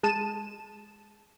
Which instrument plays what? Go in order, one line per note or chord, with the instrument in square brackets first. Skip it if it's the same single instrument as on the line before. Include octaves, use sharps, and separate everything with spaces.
[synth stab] G#3 A5 D#7 E7